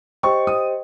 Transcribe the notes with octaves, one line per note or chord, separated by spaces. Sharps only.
G4 C5 D#5 G5 C#6
D#6